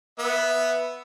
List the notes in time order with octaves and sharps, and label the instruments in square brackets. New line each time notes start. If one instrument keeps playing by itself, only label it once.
[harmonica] B3 E5